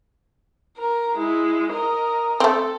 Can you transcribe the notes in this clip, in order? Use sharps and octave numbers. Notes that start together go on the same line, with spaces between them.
A#4
G#3 E4
A#4 D#5
A3 C4 A4